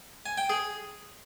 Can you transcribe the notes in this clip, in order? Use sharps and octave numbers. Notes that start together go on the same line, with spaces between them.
G#5
G5
G#4